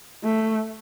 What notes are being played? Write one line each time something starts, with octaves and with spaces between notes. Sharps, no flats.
A3